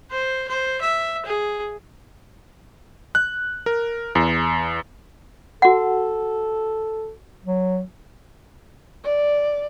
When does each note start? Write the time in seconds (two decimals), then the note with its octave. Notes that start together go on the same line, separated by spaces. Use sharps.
0.11 C5
0.48 C5
0.81 E5
1.26 G#4
3.15 F#6
3.66 A#4
4.15 E2
5.62 F#4 A4 F#5
7.45 F#3
9.04 D5